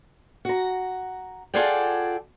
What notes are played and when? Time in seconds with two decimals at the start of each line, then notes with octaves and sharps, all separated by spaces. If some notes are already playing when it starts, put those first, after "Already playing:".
0.45 F#4 A#5
1.54 F4 G#4 A4 D5 F#5 G5